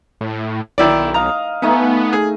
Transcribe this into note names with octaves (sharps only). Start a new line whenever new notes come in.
A2
B1 D#3 E4 D5
D#5 F5 A#5
A3 B3 D#4 G#5
G#4